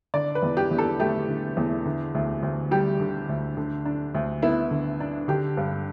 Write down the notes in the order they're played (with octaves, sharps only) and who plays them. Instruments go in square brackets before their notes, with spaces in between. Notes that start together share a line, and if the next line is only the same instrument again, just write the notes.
[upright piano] D3 D5
B4
E2
G4
E2
A4
A3 G4
D3
E2
D3
D2
D2
G3 G4
D3
D2
D3
D4
D2
B3 E4
D3
D4
D3 G4
G2